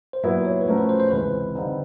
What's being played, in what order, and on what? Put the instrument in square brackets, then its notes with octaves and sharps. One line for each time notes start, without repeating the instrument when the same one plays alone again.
[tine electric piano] C5
[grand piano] A#2 F#3 B3 E4 [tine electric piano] B4
[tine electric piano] C#5
B4
[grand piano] F3 A3 C#4 F#4 A#4 [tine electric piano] C5
[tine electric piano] B4
C5
C5
[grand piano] C#2 C3 E3 [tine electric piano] B4
[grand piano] D3 G3 C4 D#4